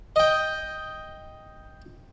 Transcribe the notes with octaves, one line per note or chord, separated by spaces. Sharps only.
D#5 G5